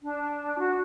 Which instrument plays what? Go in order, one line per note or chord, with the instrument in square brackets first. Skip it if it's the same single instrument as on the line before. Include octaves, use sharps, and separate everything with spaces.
[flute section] D4
F#4